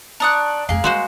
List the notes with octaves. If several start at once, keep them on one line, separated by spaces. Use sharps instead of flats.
D4 D5 A#5 C#6 D#6 F#6
F2 A3 A#3 G#4 F5
G3 G#3 F#4 C5